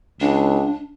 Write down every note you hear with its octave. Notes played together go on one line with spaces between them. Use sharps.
C#2 D4